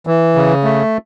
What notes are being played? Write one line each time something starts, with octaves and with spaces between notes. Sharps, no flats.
E3
C#3
A3